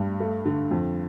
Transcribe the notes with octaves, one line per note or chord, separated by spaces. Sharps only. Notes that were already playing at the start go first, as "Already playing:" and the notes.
Already playing: G2 G3
A3
D3
F2